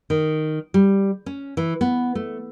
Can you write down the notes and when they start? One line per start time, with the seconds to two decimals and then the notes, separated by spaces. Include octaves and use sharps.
0.10 D#3
0.74 G3
1.26 C#4
1.57 E3
1.81 B3
2.15 A3